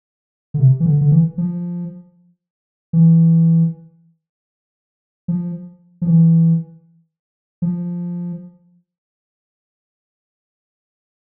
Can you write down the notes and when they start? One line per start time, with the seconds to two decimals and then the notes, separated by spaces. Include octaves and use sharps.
0.54 D3
0.60 C3
0.80 E3
0.86 D3
1.01 D3
1.12 E3
1.38 F3
2.93 E3
5.28 F3
6.02 F3
6.07 E3
7.62 F3